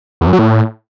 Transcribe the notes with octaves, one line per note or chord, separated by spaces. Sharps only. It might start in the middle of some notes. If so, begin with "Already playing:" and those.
E2
F#2
F#3
A2